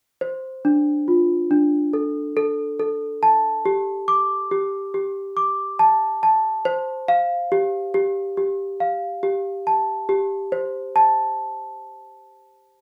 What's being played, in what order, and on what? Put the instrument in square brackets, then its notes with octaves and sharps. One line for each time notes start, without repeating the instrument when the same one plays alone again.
[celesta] C5
D4
F4
D4
A4
A4
A4
A5
G4
D6
G4
G4
D6
A5
A5
C5
F5
G4
G4
G4
F5
G4
A5
G4
C5
A5